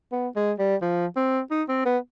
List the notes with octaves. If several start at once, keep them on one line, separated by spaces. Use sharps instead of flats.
B3
G#3
G3
F3
C4
D#4
C4
B3